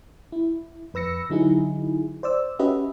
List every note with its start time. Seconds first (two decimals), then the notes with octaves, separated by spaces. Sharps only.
0.32 E4
0.94 F2 B4 E6 A#6 C#7
1.30 D3 F#3 D#4 E4 G#4
2.23 C5 D5 E6
2.59 C#4 F#4 G4 B4 D#5 E5